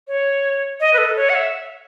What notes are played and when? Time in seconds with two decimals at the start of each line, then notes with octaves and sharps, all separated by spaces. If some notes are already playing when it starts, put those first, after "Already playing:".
0.08 C#5
0.80 D#5
0.94 B4
0.98 A4
1.16 C#5
1.29 F#5
1.35 E5